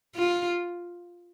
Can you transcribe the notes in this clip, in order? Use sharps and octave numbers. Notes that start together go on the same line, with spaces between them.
F4